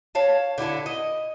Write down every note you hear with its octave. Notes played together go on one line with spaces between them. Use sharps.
C#5 F5 A5
D3 E4 G4 A4
D#5